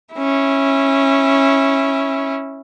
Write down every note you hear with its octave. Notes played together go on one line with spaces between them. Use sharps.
C#4 E4